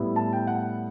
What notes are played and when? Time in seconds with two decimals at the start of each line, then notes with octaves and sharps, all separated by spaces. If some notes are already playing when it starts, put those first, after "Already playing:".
Already playing: A2 G3 B3 E4
0.16 A5
0.33 G5
0.47 F#5